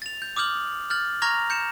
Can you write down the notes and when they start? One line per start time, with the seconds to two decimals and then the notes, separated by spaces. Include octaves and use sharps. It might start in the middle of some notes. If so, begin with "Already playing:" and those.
0.02 A6 F7
0.22 G6
0.36 D6 D#6 F6 G6 F#7
0.90 F6 G6 A6 F#7
1.22 A#5 C#6 F6 G#6 A#6 F7
1.50 G6 C#7 E7